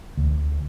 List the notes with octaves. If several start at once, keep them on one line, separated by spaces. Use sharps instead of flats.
D2